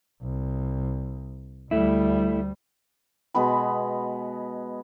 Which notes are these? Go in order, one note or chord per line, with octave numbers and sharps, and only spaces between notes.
C2
D2 G3 A3 E4
B2 G#3 B3 B5